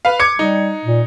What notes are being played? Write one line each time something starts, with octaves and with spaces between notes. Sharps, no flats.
B4 F5
D6 G#6 C#7
G3 D#4
A#2